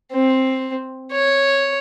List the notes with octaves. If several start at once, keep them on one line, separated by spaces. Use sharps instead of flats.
C4
C#5